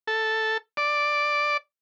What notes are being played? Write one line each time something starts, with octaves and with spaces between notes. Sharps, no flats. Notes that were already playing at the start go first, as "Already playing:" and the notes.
A4
D5